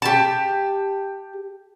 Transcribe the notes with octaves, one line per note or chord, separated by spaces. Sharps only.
G4 A5